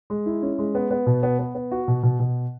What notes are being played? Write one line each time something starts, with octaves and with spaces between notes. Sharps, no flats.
G#3
E4
C#4
G#3
B3
B3
B2
B3
B3
B3
F#4
B2
B2
B2